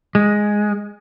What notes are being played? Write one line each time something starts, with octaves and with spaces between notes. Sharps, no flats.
G#3